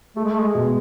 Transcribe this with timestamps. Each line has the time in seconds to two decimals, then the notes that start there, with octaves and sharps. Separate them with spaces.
0.16 A3 G#4
0.24 G#3
0.32 A3
0.42 G#3
0.54 B2